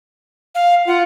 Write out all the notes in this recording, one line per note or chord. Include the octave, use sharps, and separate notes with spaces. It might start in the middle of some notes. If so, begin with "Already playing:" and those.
F5
F4 F#5